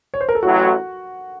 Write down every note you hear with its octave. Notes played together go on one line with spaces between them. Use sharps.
C#5
C5
A#4
A4
A1 A2 F#3 F#4